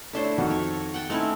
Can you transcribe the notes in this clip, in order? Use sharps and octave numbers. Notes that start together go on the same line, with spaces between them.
A3 D4 E4 A4 C5 C#5
F2 D#3 F#4 F#5
C#5
F#5 G5 A5
A3 C4 C#4 D#4 E4